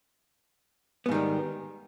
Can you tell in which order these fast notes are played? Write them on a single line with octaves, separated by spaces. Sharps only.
B3 G#2 D#3 G3